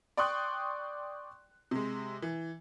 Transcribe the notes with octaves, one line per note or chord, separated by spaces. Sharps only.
D5 G5 C6 C#6 D#6 F#6
C3 G#3
E3